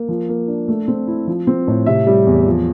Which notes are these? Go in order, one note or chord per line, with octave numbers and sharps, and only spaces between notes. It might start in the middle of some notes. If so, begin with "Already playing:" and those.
Already playing: A#3
F3
A#3
D4
A3
C4
E4
F3
C4
A2
C3 E5
G3
E2
F3